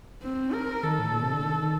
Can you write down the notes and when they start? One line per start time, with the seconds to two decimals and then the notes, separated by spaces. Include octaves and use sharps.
0.22 C4
0.53 A#4
0.83 D#3 A4
0.99 A2
1.11 A#2
1.22 C3
1.33 D3
1.45 D#3